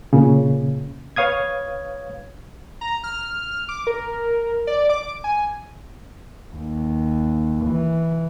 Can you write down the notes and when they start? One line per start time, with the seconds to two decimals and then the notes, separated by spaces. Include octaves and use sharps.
0.13 A#2 C#3
1.16 B4 C#5 F5 D#6 G#6
2.81 A#5
3.04 F6
3.69 D6
3.87 A#4
4.67 D5
4.90 D6
5.24 G#5
6.56 D#2
7.65 E3